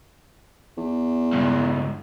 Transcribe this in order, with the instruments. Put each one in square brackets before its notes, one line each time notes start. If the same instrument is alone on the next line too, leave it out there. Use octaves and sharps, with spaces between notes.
[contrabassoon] E2
[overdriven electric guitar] C#2 G2